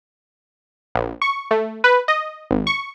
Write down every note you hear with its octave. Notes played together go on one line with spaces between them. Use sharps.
A#1
C#6
A3
B4
D#5
G#1
C#6